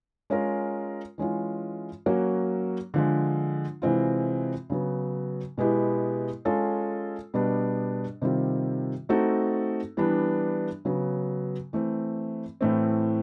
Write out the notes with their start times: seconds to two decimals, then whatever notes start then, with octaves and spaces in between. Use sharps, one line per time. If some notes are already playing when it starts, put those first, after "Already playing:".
0.30 G#3 C#4 F4 A#4
1.18 E3 G#3 C#4 F4
2.06 F#3 A#3 C#4 F#4 A#4
2.94 D3 F3 G#3
3.82 C3 E3 G#3 C4 F4
4.70 C#3 F#3 B3
5.58 B2 G#3 B3 E4 G4
6.45 G#3 C#4 F4 A4
7.34 B2 G3 B3 D4
8.22 C3 D#3 G3 C4 F4
9.09 A3 C4 D#4 F#4 A4
9.97 E3 G3 B3 D4
10.85 C#3 F#3 B3
11.73 E3 A3 C4
12.61 A2 E3 A3 C4